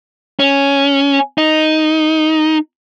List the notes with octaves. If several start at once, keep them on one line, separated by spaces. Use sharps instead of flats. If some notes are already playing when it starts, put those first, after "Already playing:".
C#4
D#4